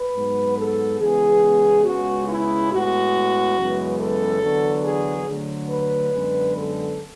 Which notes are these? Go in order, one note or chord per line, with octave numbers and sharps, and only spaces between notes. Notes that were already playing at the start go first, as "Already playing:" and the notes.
Already playing: B4
G#2 F#3 B3
A4
E2 C#3 E3 G#3 B3 G#4
C#2 C#3 G#3 B3 F#4
E4
A2 G#3 B3 F#4
F#2 C#3 E3 G#3 B3
A4
E2 D3 F#3 B3
G#4
D2 D3 F#3
B4
F#2 D3 G#3 B3
A4